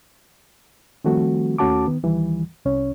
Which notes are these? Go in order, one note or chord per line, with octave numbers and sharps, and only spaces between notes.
D#3 F3 G3 A3 C4 F#4
D#2 A3 C#4 F#4 A5 D6
D#3 B3
D2 D#3 E3 G3
C2 C#4 C#5